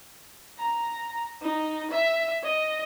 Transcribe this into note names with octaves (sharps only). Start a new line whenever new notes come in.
A#5
D#4
E5
D#5